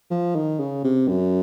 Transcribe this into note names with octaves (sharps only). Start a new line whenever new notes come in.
F3
D#3
C#3
C3
F#2